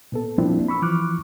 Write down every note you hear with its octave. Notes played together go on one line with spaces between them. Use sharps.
A#2 B3 A4
F3 G3 A#3 C4 D4 E4
B5 C#6 E6
E3 F3 C#6 D6 F6 F#6